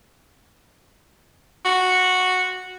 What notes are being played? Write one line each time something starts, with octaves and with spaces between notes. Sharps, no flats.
F#4